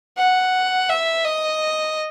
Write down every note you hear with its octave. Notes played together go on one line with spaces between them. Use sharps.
F#5
E5
D#5